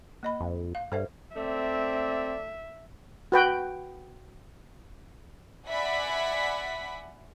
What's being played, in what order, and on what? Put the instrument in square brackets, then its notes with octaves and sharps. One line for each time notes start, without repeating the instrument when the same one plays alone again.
[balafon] A#3 D#5 B5
[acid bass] F2
[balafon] F5
[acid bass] G2 [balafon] A4 C5 E5
[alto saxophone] A3 [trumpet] C4 [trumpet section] D5 [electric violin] E5
[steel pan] F#4 B4 G5
[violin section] D5 E5 F#5 G#5 B5 B6